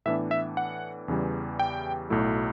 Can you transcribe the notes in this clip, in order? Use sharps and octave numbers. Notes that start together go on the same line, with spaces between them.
A2 E3 B3 D4 E5
E5
F#5
E2 C#3 E3 G3
G5
B1 A2 F#3 A3 E4